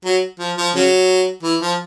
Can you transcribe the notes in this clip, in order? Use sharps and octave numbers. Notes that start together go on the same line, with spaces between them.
F#3
F3
F3
C#3 F#3
E3
F3